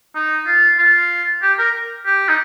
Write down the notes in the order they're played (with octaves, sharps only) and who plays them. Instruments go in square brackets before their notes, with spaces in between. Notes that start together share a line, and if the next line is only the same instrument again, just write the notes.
[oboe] D#4
F4
F4
G4
A#4
G4
D#4